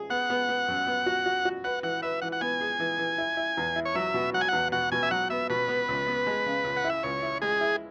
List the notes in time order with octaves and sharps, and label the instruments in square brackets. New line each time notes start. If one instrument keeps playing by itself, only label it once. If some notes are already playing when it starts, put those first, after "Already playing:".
Already playing: [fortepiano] G#4
[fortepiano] B3 [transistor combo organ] F#5
[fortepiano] B3
B3
F#2
B3
F#4
F#4
F#4
[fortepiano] B4 [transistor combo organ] F#5
[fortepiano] E3 [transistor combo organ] F#5
[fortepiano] B4 [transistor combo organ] E5
[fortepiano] E3 [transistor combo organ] F#5
[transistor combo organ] F#5
[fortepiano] B3 [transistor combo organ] G#5
[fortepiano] G#4
E3
E3
E4
E4
E2
E4
[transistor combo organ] C#5
[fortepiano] F#3 [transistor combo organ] E5
[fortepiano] B2
[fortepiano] F#3 [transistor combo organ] F#5
[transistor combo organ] G#5
[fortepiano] E2 [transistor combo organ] F#5
[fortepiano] B2 [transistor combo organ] F#5
[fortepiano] B2 [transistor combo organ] G#5
[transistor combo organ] E5
[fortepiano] F#3 [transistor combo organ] F#5
[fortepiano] B3 [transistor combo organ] E5
[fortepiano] B2 [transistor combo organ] B4
[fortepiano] B3
C#2
B3
G#3
C#3
C#2
[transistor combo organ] F#5
[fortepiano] E4
[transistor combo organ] E5
[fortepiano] C#2 [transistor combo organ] C#5
[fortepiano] E4
[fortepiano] G#3 [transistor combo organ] G#4
[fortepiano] E4